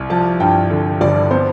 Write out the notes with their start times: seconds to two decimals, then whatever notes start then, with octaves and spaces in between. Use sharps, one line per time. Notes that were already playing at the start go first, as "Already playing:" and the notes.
Already playing: C2
0.10 F3 A5
0.40 G2 G5
0.70 D3
1.01 G1 D5
1.31 B3 C5